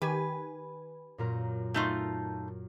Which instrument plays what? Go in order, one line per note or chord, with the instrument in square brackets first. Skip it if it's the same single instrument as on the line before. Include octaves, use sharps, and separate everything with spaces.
[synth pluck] D#3 G4 G#5 [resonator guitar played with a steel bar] B4
[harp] F#2 A#2 A#4
[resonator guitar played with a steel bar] A3 D#4 F4